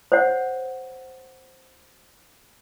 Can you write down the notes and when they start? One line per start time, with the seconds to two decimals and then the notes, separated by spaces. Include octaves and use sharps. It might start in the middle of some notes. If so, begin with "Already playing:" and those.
0.12 C5 C#5 F#5